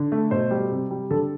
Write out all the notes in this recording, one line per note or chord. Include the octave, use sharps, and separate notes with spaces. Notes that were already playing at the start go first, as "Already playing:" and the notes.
Already playing: D3
A3
B2 C5
G3
C3
G3
D3 A4